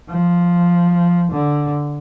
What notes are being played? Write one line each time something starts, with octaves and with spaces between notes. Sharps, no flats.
F3
D3